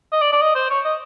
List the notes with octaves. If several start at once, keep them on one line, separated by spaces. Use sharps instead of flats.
D#5
D5
D5
D#5
C5
C#5
D#5